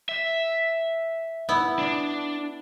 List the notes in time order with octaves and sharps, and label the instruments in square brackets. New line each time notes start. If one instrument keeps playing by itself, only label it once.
[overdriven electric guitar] E5
[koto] B3 E4
[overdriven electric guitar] D4